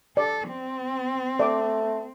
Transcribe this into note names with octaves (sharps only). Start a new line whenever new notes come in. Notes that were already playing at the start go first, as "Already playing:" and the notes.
A4 D5
C4
A3 D5 D6